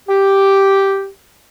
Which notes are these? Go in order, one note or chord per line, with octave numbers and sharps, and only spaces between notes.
G4